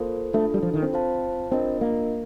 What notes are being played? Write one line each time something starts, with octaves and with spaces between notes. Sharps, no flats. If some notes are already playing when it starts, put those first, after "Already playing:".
Already playing: A#3 F4 A4 C5
A3 D4 F4 A4
G3
F3
D#3
C4
F4 C5 F5 A5
C4 D4 F4 A#4 D#5
A#3